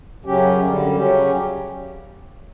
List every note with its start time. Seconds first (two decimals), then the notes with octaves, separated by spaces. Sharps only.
0.24 F#2 C#3 F#3 C#4 G4
0.61 F#2 D3 G3
0.96 C#3 F#3 C#4 G4